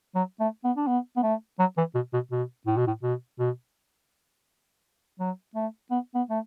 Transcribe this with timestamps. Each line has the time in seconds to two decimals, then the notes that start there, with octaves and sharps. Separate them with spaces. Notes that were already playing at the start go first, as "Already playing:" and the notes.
0.15 F#3
0.40 A3
0.64 B3
0.77 D4
0.87 B3
1.17 B3
1.23 A3
1.59 F#3
1.78 E3
1.95 B2
2.14 B2
2.32 B2
2.67 A2
2.77 B2
2.87 A2
3.03 B2
3.39 B2
5.20 F#3
5.56 A3
5.91 B3
6.15 B3
6.30 A3